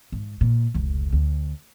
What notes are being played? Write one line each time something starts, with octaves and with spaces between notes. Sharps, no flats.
G#2
A#2
F1 C#2
D2